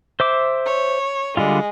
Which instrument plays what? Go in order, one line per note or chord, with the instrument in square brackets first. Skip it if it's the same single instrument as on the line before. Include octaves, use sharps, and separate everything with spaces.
[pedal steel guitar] C5 E5 D6
[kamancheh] C#5
[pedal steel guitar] D3 G3 F4 [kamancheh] G#3